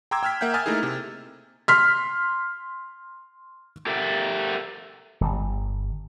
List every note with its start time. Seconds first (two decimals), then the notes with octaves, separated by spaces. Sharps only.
0.11 G5 A#5 C6 D6 E6 G#6
0.23 G5 E6 F6 G#6 B6
0.41 A#3 E5 F#5 G5 G6
0.54 E5 G#5 D#6 F6 G#6 A6
0.66 A3 A#3 D#4 E4 G#4
0.83 C3
1.68 C6 F6 B6
3.87 G4 A4 A#4 E5
5.21 D1 G1